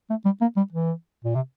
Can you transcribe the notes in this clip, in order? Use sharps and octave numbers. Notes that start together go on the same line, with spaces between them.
A3
G3
A#3
G3
E3
A#2
C3